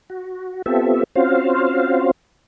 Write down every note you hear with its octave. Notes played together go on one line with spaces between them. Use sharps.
F#4
B3 C4 F4 G4 A4 E5
C4 C#4 F4 F#4 C5 F5